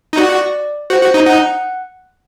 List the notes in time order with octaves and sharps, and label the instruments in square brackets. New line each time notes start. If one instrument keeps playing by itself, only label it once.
[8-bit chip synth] D#4
[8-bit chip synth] F#4 [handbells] D5
[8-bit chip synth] F#4 [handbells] C5
[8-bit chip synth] F#4
D#4
[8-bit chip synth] D#4 [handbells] F#5